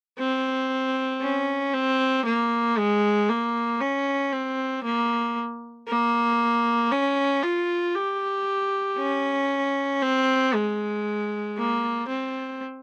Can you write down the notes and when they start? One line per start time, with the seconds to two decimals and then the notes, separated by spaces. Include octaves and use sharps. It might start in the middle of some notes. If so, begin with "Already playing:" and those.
0.19 C4
1.22 C#4
1.74 C4
2.26 A#3
2.77 G#3
3.29 A#3
3.81 C#4
4.32 C4
4.84 A#3
5.88 A#3
6.92 C#4
7.43 F4
7.95 G4
8.98 C#4
10.02 C4
10.54 G#3
11.57 A#3
12.08 C4